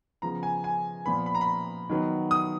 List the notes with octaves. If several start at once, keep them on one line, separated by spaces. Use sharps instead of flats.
C#3 F3 B3 A#5
G#5
G#5
A#2 F3 B3 B5
B5
A#5
B5
D#3 F#3 B3
D#6